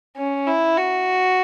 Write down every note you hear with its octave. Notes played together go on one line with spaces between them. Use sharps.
C#4
E4
F#4